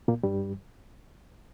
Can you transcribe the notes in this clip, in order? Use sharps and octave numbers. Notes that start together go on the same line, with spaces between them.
A#2 A#3
G2 G3